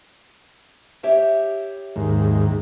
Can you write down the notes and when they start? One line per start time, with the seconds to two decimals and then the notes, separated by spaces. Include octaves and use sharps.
1.03 G4 C#5 E5
1.96 D#2 G#2